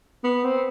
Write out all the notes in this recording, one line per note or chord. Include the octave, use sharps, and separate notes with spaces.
B3
C4